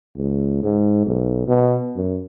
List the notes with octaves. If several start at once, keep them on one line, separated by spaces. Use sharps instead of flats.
C#2
G#2
B1
B2
F#2